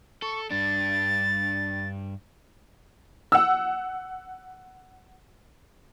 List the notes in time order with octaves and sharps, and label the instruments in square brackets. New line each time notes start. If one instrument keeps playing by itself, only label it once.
[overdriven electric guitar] A4 [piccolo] C#6
[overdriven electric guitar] G2 D4 [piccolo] A6
[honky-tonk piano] F#5 E6